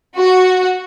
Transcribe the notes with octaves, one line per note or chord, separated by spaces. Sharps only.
F#4